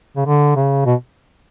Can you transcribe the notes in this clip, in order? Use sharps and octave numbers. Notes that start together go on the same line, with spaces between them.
C#3
D3
C#3
B2